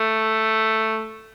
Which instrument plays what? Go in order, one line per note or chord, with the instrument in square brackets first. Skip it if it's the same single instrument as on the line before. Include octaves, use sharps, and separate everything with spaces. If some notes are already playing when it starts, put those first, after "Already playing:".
Already playing: [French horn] A3